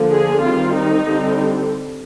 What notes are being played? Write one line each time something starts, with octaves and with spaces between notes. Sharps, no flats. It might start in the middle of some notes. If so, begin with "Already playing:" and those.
Already playing: D3 F3 A#3
G#4
D#3 G3 C4 F4
D#4
D3 G3 C4